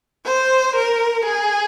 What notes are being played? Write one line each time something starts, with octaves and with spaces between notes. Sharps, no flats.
C5
A#4
G#4